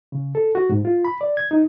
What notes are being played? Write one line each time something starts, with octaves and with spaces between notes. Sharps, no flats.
C#3
A4
F#4
G#2
F4
B5
D5
G#6
D#4